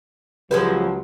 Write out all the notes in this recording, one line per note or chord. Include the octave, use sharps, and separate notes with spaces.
C#2 F3 F#3 G#3 G4 B4